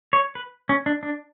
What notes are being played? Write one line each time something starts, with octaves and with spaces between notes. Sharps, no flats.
C#5
B4
C#4
D4
D4